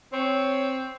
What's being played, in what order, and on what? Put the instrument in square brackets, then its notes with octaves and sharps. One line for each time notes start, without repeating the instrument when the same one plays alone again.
[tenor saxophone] C4 [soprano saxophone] C#5